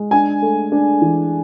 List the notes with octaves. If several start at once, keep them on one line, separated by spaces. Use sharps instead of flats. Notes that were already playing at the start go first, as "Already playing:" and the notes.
Already playing: G#3
D4 G#5
A3
D4
E3